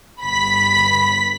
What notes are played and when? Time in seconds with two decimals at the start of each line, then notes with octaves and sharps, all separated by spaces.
0.23 G1 B5 B6